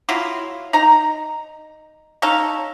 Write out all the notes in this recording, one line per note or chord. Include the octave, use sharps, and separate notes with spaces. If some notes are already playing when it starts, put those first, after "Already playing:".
F#3 E4 F4
D#4 A#5
C#4 D#4 A4 F5